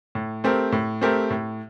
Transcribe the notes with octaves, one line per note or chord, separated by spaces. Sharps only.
A2
A3 C4 G4 A#4
A2
A3 C4 G4 A#4
A2